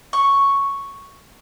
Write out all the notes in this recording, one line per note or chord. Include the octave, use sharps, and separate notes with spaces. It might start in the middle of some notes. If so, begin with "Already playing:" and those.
C#6